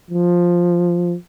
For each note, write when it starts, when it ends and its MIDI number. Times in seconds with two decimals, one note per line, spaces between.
0.11 1.15 53